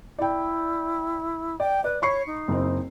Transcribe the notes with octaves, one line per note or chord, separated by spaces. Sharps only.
E4 D5 G5
D5 G5
B4 D5
C#5 B5 C#6 C7
D#4
F#1 C4